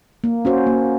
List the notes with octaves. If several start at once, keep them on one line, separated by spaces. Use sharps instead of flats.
A#3
C#4 F#4 C5
A#3